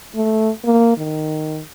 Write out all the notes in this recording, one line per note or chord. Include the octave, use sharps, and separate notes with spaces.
A3
A#3
D#3